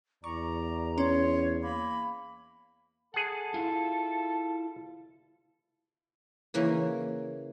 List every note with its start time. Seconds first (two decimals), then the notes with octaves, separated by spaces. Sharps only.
0.24 E2 D5 A#5 C#6
0.98 C#4 C#5 C6
1.63 A#3 B5
3.14 G#4 A4 F#5
3.54 E4 F4
6.54 C#3 E3 A#3 C#5